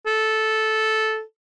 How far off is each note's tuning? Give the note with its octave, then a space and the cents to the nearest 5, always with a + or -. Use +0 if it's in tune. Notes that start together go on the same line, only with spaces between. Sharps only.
A4 -10